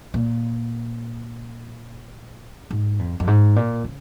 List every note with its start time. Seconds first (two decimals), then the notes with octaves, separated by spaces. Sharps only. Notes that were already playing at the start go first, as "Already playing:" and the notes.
0.14 A#2
2.71 G#2
2.99 F2
3.20 F2
3.27 G#2
3.56 A#2
3.85 C#3